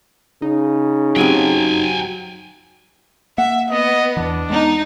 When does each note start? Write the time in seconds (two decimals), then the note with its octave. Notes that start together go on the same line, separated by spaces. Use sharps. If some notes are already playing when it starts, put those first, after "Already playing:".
0.42 C#3 D#4
1.16 F#3 C4 G4 G5 G#5
3.38 A#3 E5 F#5
3.70 B3 D#5
4.17 E2 E3 D4
4.50 G#3 B3 D#4